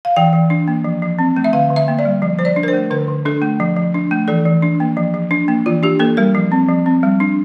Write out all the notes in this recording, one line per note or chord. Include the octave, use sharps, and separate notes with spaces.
F5
E3 G5
E3
D4
A#3
F3
F3
C4
A3
E5
D3 F5
D3
E5
A#3
D5
G3
F3
F3 C5
D5
D4
A#4
C5
A3
D3 A#4
D3
D4 A4
A3
F3
F3
D4
A3
E3 A4
E3
D4
A#3
F3
F3
D4
A#3
E3 F4
D4 G4
A#3 A4
G3 A#4
F3
C4
F3
C4
G3
D4